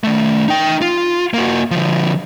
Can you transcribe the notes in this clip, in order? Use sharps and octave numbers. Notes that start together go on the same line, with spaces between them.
D#3 A3
D#4 G5
F4
A#3 F#4
D3 F3